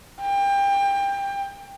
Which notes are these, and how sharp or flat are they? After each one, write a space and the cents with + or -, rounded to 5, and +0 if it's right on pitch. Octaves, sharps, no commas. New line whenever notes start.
G5 +25